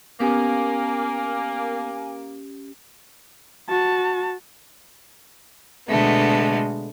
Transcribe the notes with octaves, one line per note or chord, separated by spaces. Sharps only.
A#3 B3 C#4 G4 G#5
F#4 A5
B2 D3 G#3 A3 B3